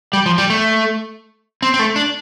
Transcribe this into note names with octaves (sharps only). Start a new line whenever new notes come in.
G3
F3
G3
A3
C4
C4
A3
D4